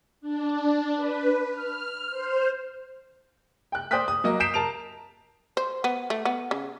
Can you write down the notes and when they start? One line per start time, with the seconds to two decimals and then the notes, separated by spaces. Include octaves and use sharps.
0.21 D4
0.96 B4
1.51 F6
2.10 C5
3.72 G5 F#6
3.91 C5 D5 G5 D#6 F#6 B6
4.08 D#6
4.24 F#3 A#3 D#5
4.40 D#6 G6 B6 C7 D7 E7
4.54 A#4 A5 D7 F7
5.57 C5
5.84 B3
6.10 A3
6.25 B3
6.51 C#3